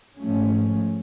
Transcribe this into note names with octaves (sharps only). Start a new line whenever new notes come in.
G#2 F3 A3 C#4